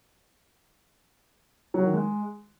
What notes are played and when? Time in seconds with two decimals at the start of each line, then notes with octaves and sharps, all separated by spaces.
1.74 F#3
1.84 D#3
1.93 G#3